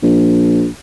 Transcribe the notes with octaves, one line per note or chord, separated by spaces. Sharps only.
A#1